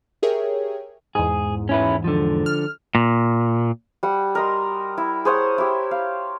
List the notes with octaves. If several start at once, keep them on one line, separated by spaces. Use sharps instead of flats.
G4 G#4 A#4 C#5 E5 G5
E2 G#2 G#4
C#4 E4 B4
D3 F3
F6
A#2
G3 F#5
A#4 D#5 C6
E4
G#4 C5 C#5 F#5
E4 G4
F5